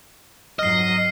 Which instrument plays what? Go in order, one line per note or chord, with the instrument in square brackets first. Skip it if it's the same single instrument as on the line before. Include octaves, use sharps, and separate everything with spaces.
[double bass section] F2 G#2 F#3 [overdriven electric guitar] D#5 [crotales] F6 C7